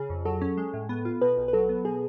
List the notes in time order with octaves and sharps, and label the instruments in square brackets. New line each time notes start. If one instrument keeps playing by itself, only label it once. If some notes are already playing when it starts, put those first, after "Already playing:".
Already playing: [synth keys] C#3 [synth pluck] G#4
[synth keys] F2
[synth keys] F#3 [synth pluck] A4
[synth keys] C#4
G#3
A2
B3
F4
[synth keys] B2 [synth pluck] B4
[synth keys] B1
[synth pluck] B4
[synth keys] F#3 [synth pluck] A4
[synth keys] B3
[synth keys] B2 [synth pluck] G#4